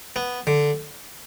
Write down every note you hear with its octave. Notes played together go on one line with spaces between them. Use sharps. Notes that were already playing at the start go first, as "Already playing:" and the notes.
B3
D3